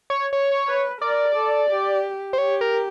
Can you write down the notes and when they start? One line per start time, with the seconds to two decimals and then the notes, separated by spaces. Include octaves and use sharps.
0.10 C#5
0.33 C#5
0.67 B4
1.02 A#4 D5
1.35 A4
1.70 G4
2.33 C5
2.38 G4 C#5
2.61 A#4